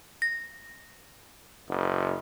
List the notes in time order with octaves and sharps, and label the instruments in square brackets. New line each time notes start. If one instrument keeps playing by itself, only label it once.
[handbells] A#6
[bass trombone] F#1